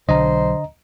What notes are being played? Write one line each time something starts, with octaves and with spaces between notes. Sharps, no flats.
B1 D3 F#3 C5 D#5 A#5